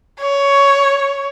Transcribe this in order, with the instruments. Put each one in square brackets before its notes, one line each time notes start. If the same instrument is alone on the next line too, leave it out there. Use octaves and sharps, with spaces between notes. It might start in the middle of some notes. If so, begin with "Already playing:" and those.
[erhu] C#5